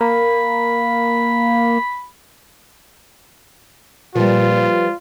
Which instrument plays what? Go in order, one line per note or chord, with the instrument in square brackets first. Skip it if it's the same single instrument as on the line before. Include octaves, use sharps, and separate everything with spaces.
[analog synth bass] A#3 [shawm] B5
[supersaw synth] A#2 [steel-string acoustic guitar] F3 G3 [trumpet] F4 [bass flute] B4